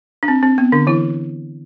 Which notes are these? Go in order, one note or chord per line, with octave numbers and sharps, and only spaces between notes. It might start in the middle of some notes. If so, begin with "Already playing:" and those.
D4
C4
C4
B3
D3 D4
E3 E4